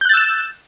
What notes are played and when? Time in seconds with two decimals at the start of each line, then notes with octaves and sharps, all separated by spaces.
0.01 G6
0.05 F#6
0.09 A6
0.13 E6
0.17 E7